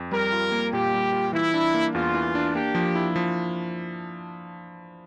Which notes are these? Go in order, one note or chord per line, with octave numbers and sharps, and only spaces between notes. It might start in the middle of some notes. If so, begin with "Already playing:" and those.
Already playing: F2
G3 A#4
F4
A#3
A#2 G4
G3
F4
E3 E4
D4
A#3
E2 F4
E3
D4
A#3 G4
F3
E4
F3